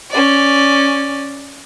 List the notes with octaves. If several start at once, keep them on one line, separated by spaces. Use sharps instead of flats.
C#4 D5